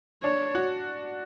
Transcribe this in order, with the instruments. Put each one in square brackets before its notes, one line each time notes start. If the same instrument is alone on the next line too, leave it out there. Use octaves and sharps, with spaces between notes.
[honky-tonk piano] D4 [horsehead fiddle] C#5
[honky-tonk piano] F#4